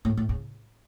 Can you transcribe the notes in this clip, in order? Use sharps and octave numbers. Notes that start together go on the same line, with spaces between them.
A2
A2
C#3